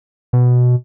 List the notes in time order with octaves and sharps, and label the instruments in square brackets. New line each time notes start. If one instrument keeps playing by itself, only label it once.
[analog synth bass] B2